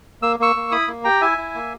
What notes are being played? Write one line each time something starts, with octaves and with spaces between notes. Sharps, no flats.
A#3 E6
A#3 C#6 E6
A#3
E4 B5 D#6
A#3
G4 G5 A#5
E4 E5 G#5
E4
A#3